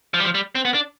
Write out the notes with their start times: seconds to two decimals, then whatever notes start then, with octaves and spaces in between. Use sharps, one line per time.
0.14 F3
0.20 G3
0.24 F3
0.35 G3
0.55 C4
0.65 B3
0.74 D4